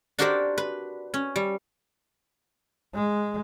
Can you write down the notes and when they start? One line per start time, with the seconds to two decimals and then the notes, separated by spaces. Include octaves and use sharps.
0.19 D4 F#4 G4 A#4 C5 D5
0.58 B4
1.14 C#4
1.36 G3
2.95 G#3